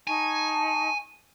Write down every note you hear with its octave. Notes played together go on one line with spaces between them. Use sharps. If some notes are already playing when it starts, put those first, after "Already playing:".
D#4 G#5 A5 C#6